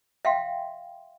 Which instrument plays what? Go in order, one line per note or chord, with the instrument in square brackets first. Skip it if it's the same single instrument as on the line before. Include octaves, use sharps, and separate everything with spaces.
[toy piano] E5 F5 G5 C6